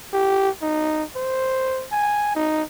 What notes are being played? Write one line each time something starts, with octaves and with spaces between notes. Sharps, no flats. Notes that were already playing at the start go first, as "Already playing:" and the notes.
G4
D#4
C5
G#5
D#4